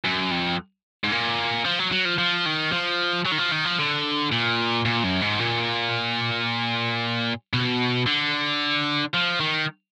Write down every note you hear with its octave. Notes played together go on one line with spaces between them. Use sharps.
F#2
F2
G#2
A#2
F3
F#3
F#3
F3
F3
D#3
F3
F#3
D#3
F3
D#3
F3
D3
A#2
A#2
F#2
G#2
A#2
B2
D3
F3
D#3